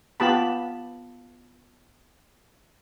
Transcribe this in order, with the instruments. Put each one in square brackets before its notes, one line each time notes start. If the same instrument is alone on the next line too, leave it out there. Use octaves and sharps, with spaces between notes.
[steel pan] B3 F4 G4 A5 B5